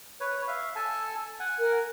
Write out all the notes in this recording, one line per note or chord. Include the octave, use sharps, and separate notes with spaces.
B4 C#5
E5 F5
A4 G#5 A5
F#5 G#5
A#4